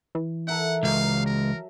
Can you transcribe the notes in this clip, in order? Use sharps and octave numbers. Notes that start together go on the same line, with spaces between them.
E3
A4 A#4 E5 F#5
C#2 F#3 F5 A#5
A#4